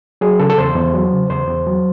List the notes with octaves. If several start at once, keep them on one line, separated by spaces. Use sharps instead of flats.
F#3 G#4
C#3 A4
A4
E2 C5
E2
F#3
C#3
E2 C5
E2
F#3